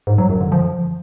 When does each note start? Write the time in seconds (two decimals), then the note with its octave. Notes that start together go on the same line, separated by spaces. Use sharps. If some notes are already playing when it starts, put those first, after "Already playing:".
0.07 G#2
0.18 F#3
0.29 F#2
0.41 D3
0.52 F3